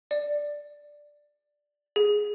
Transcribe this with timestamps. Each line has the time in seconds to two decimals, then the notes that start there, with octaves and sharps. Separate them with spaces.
0.11 D5
1.96 G#4